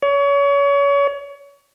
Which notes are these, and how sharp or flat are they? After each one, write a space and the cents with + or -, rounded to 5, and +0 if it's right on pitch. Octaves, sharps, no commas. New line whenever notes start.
C#5 +30